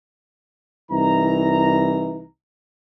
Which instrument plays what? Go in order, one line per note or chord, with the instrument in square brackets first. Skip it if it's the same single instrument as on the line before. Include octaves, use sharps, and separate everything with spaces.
[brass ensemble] C2 E3 D#4 A#5